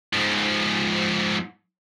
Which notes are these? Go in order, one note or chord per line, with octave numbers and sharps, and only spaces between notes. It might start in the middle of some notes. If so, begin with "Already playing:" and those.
G#2 F3